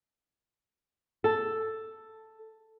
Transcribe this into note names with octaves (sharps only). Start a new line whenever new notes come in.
A4